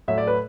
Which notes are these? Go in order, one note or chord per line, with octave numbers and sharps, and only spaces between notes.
A2 F#3 E5
D5
B4